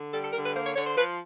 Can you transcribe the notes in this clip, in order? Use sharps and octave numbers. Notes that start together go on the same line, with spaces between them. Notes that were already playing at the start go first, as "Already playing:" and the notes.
Already playing: D3
G3 A4
A4
D3 A#4
B4
A#3 C5
C#5
D3 C#5
C5
F3 B4